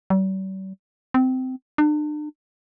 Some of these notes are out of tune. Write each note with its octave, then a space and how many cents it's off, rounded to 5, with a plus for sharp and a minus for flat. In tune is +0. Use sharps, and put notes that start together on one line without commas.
G3 -45
C4 -20
D4 +40